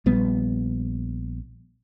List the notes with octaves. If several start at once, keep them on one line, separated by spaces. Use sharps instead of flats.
A#1 G3 B3